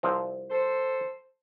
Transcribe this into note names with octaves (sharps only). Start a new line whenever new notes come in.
C2 F3 C4
A4 C5